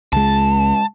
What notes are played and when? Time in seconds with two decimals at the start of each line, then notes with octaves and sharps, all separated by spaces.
0.13 C#2 G#3 A5